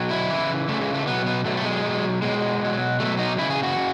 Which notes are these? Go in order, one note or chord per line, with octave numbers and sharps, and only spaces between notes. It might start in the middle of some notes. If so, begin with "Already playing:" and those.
Already playing: B2 F#3
E4
C#3 E3
C#3 E3 A3
G#3
A3
B2 F#3 B3
B3
B2 F#3 A3
A3
G#3
B2 F#3
B2 F#3 G#3
B2 F#3
B2 F#3 A3
D#4
C#3 E3 E4
G#4
F#4
C#3